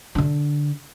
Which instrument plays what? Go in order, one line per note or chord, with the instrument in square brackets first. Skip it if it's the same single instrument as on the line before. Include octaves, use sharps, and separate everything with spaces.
[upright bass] D3 D4